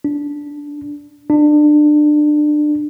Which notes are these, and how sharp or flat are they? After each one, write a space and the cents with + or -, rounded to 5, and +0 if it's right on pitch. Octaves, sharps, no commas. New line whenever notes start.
D4 -10
D4 +25